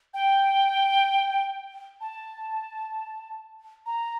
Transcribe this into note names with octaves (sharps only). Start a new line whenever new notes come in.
G5
A5
A#5